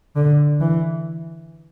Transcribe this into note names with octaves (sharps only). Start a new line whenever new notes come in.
D3
E3